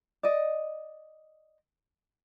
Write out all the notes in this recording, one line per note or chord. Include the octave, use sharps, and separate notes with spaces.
D5 D#5